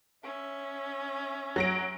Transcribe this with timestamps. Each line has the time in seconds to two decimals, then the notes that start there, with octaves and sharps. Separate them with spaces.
0.23 C#4 E5
1.56 F#3 A#6 D7